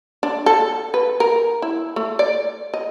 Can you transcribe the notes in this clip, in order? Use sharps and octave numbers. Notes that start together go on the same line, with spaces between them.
D4
A4
B4
A#4
E4
A3
D5
D#5